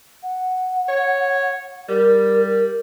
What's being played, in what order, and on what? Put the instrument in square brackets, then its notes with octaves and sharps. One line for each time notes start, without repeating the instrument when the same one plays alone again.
[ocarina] F#5
[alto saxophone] C#5
[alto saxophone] G3 [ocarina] A#4